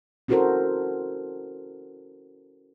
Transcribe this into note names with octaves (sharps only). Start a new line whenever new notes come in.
C#4 E4 F#4 A4 A#4 C5